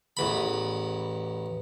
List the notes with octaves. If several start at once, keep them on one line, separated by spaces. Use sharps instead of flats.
A1 E2 B5